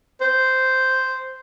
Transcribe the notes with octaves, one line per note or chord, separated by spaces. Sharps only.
C5